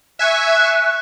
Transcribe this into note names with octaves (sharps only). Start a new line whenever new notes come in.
E5 G#5 C#6 F#6